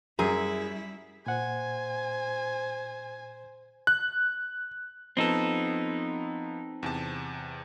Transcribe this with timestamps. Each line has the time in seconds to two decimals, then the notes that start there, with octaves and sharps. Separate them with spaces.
0.19 F#2 G3 E4 G#4
1.26 A#2 C5 F#5 G#5
3.87 F#6
5.17 F3 B3 C4 D#4 A4
6.83 E2 C3 A5